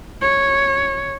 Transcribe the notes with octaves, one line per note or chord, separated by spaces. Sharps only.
C#5